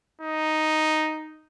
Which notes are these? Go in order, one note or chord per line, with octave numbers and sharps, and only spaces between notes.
D#4